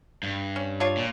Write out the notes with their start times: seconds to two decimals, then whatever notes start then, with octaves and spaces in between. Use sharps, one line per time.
0.23 G2
0.56 C#4
0.80 D4 F4 C#5
0.97 A#2